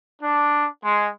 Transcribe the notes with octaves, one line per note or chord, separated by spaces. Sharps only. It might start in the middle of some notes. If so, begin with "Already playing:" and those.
D4
G#3